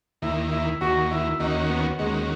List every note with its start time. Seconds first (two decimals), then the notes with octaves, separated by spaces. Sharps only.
0.22 D#2 D#3 A#3 E4
0.52 E4
0.81 D#2 D#3 A#3 F#4
1.11 E4
1.39 D#2 D#3 A#3 C#4 D#4 F#4
1.70 B3
1.99 D#2 D#3 G#3 A#3 C#4 F#4